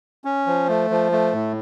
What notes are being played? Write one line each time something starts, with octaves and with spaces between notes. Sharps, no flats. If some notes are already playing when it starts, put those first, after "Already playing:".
C#4
F3
A3
F3
A3
A2